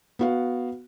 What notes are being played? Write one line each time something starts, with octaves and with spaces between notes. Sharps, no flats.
B3 F#4 F5